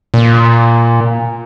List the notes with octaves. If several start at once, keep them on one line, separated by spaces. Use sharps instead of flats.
A#2